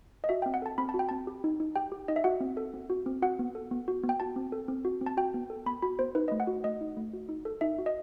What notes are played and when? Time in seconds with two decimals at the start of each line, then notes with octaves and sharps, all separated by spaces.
0.24 D#5
0.29 F#4 E5
0.42 C4 G5
0.54 F#5
0.62 A4 A5
0.78 C4 B5
0.89 A5
0.94 F#4
0.99 G5
1.09 C4 A5
1.27 G4
1.44 D#4
1.60 D#4
1.76 G4 G5
1.92 G4
2.08 D#4 D#5
2.16 E5
2.24 F#4 F#5
2.41 C4
2.57 A4
2.74 C4
2.90 F#4
3.06 C4
3.22 F#4 F#5
3.39 B3
3.55 A4
3.71 B3
3.88 F#4
4.03 B3
4.09 G5
4.20 F#4 A5
4.36 C4
4.52 A4
4.68 C4
4.85 F#4
5.01 C4
5.06 A5
5.17 F#4 G5
5.34 B3
5.50 A4
5.66 B3 B5
5.82 F#4 B5
5.99 B3 C5
6.15 D#4 B4
6.28 A3 D#5
6.40 F#5
6.47 F#4
6.64 A3 D#5
6.81 D#4
6.97 A3
7.13 F#4
7.29 D#4
7.45 A4
7.61 D#4 E5
7.78 F#4
7.86 D#5